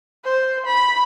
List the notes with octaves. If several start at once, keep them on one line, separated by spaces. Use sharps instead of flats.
C5
B5